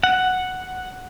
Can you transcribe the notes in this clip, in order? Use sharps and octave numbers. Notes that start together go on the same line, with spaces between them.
F#5